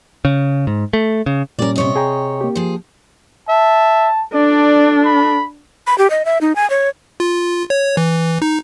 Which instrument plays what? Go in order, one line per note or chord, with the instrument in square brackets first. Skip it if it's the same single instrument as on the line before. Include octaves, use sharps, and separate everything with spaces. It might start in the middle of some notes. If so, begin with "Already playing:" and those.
[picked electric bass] C#3
G#2
A3
C#3
[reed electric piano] A#2 G3 C#4 [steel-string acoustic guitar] A#4 D5
[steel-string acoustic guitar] C3 C#5 D#5
[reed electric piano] G#4 G5 A#5
A#3 G4
[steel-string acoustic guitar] F3 G#4
[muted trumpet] E5 [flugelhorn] A5
[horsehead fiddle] D4 [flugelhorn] A4 [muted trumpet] D5
[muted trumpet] B5
[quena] B5
G4
D#5
E5
D#4
G#5
C#5
[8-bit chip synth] F4
C#5
E3
D#4